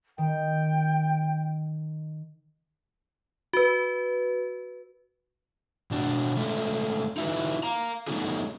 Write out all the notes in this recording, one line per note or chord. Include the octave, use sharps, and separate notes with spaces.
D#3 G5
F#4 B4
B2 D4 F#4
G#3 A3 C#4
D#4 E4 F#4 B4
F5 A#5
G3 A3 B3 C#4 D#4 G#4